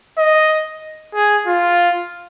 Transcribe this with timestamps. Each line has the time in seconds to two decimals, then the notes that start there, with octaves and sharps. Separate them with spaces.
0.18 D#5
1.15 G#4
1.47 F4